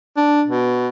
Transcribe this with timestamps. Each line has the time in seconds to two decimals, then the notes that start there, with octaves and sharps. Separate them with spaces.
0.17 D4
0.48 B2